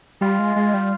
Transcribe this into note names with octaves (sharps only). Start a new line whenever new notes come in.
G3 F4
G#3
G#3
G3